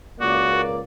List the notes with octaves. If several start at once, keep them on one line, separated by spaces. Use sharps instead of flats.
C#2 A#3 F#4 D5